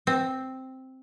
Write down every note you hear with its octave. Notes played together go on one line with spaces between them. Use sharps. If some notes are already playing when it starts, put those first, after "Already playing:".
C4